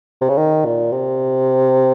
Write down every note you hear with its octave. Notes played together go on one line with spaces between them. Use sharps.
C3
C#3
D#3
A#2
C3